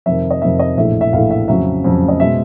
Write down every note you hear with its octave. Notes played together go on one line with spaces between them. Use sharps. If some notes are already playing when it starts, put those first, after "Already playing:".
F2 C3 D#3 E5
D#5
F2 C3 D#3 E5
D#5
A#1 A2 E3 A3 E5
E5
A#1 A2 E3 A3 F5
E5
F2 C#3 F#3 E5
F2 C#3 F#3
D#5
B2 G#3 E5